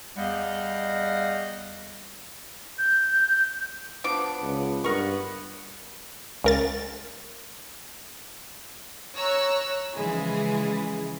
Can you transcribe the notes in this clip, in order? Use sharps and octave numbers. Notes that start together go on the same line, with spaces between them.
E2 G3 D#5 F5 F#5
G6
F3 B3 D4 D6
C#2
G2 B3 A#4 C#6
C#2 A#4 A6
C#5 A#5 C#6 E6 F#6
C#3 E3 F3 G#3 E4 G#4